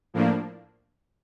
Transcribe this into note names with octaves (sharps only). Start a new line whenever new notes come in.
A2 F3 A#3 D4